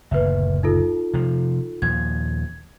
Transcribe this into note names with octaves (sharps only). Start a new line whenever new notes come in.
F#1 D2 A#2 B4 E5
D#4 F4 A4
C3 F3
D#2 A#2 F3 G#6